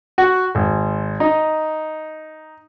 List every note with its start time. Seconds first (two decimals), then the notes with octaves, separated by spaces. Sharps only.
0.18 F#4
0.55 G#1
1.20 D#4